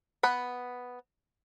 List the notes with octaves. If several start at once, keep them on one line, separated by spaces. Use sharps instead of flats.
B3 F#5 B5